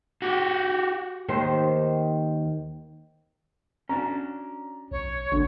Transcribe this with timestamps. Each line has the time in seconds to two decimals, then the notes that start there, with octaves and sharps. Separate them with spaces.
0.22 F#4 G4
1.28 D#2 D#3 C5
3.89 C#4 D4 F#4 A#5
4.91 B1 C#5
5.32 G#1 D3